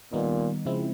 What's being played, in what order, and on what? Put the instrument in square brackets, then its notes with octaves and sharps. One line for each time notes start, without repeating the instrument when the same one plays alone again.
[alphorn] A#2 [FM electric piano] D#3 G3 B3 D#4
[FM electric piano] C#3 F3 G#3 C4 E4